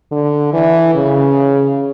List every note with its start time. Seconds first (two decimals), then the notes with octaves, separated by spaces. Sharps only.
0.12 D3
0.53 E3
0.95 C#3